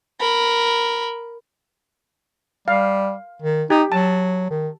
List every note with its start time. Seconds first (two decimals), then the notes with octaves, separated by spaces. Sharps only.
0.20 A#4 B5
2.68 G3 F5
3.42 D#3
3.70 D#4 G4
3.92 F#3 A5
4.50 D#3